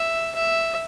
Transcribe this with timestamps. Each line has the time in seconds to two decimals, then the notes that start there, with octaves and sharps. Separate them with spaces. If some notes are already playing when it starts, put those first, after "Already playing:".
Already playing: E5
0.35 E5